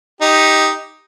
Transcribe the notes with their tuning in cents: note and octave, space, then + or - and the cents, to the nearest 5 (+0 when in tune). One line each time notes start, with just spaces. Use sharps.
D#4 +5 G4 +0